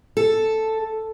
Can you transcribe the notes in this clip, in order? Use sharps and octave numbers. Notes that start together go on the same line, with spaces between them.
A4